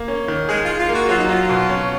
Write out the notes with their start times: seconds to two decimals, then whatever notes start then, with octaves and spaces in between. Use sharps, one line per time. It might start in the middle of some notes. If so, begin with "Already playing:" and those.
Already playing: A#3
0.08 C#4
0.28 D#3
0.49 G#3 G#4
0.64 F4 G#4
0.78 F4
0.89 A#3
0.94 F#4
1.08 F#3 F4
1.18 D#4
1.29 F#3 F4
1.49 B2
1.69 C#4